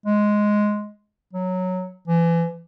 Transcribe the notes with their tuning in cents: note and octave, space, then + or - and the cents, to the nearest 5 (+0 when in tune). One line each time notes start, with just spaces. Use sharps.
G#3 +5
F#3 -5
E3 +30